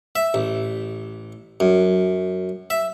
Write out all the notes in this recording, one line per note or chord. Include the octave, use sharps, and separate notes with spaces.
E5
A1
F#2
E5